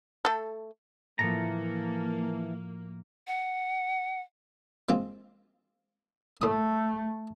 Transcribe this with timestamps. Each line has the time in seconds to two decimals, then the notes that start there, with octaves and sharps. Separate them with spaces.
0.25 A3 A4
1.19 A2 E3 F3 A#3 A4 A#5
3.27 F#5
4.89 G#3 C4 F4
6.42 A2 A3 D#6